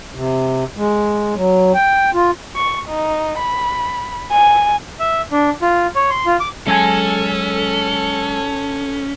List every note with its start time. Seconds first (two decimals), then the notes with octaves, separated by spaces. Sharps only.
0.15 C3
0.77 G#3
1.36 F#3
1.74 G5
2.14 F4
2.56 C#6
2.89 D#4
3.39 B5
4.32 G#5
4.99 E5
5.31 D4
5.62 F4
5.95 C#5
6.10 C6
6.26 F4
6.40 D6
6.68 F#3 G#3 C#4 A4 G#5